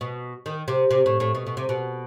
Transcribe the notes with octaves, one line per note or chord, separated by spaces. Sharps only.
B2
D#3
C3
C3
A2
A2
B2
B2
C3
B2